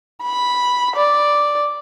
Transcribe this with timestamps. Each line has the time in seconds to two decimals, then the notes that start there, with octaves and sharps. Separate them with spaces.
0.23 B5
0.96 D5